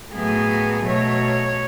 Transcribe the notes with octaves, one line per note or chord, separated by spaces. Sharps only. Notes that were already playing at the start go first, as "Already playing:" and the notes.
A2 F#3 B3 G#4
B2 F#3 A3 C#5